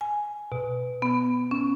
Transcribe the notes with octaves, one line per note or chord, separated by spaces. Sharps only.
G#5
B2
B3
C#4